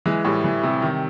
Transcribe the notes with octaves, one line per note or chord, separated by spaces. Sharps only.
E3 G#3
A2 G3
E3
C3
D#3